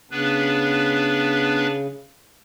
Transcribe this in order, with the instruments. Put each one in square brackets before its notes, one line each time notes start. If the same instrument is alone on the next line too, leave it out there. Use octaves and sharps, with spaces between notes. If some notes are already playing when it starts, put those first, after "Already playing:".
[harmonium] C#3 [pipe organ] B3 D4 B4